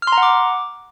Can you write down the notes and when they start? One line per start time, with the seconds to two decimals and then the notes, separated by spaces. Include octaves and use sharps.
0.02 F6
0.07 C6
0.12 A#5
0.18 F#5
0.23 D6